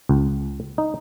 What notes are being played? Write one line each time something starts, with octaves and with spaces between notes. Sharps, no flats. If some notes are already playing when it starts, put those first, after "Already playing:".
C#2
D#4